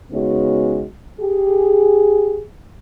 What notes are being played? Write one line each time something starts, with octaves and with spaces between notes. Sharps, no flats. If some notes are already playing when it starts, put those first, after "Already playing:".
C#3 G#3 B3 C#4 D#4 F#4
G4 G#4